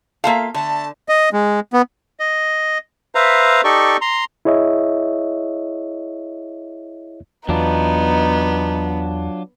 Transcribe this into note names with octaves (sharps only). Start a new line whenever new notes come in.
A#3 F4 A4 E5 F5
D3 A3 A5
D#5
G#3
B3
D#5
B4 C5 E5 F5 A#5
D#4 G4 A4 D5 C#6
A#5 C6
E4 G#4 C#5 D#5 E5
E2 F#3 B3 D4 D#4 F4